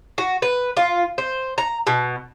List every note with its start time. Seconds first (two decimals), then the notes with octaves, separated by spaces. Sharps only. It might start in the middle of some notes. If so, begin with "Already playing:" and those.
0.18 F#4
0.42 B4
0.77 F4
1.18 C5
1.58 A#5
1.87 B2